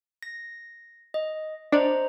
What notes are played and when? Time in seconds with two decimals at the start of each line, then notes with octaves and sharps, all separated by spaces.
0.23 A#6
1.14 D#5
1.72 D4 C5 D#5 A#5